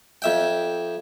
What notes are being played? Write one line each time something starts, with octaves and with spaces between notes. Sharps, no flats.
F2 E5 G5